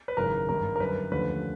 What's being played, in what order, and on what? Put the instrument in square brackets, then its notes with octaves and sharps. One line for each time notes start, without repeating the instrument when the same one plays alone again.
[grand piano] B4
G#1 F#2 C#3 E3 A#4
G#1 G2 D#3 A#4
A#4
F#2 D3 G3 B4
D#2 D3 F3 A3 C#4 B4